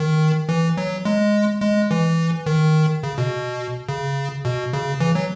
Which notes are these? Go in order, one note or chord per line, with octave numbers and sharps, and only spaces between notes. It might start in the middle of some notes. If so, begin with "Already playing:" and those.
Already playing: D#3
E3
F#3
G#3
G#3
E3
D#3
C#3
B2
C#3
B2
C#3
E3
F#3